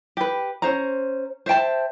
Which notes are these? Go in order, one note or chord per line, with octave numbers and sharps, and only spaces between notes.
G4 B4
C#4 C5 A#5
C5 E5 G5 A5